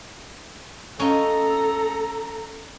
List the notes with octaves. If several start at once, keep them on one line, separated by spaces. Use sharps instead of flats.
C#4 D#4 F4 A4 A#5